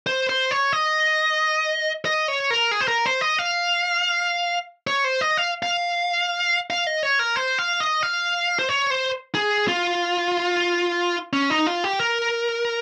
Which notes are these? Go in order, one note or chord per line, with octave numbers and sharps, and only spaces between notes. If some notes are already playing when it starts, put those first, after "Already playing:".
C5
C5
C#5
D#5
D#5
C#5
A#4
G#4
C5
A#4
C5
D#5
F5
C#5
C5
D#5
F5
F5
F5
D#5
C#5
A#4
C5
F5
D#5
F5
C5
C#5
C5
G#4
F4
C#4
D#4
F4
G4
A#4